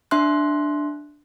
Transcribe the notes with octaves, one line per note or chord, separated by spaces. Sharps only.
D4 E5 C6 F#6